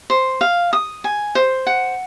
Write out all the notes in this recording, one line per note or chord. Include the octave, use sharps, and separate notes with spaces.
C5
F5
D#6
G#5
C5
F#5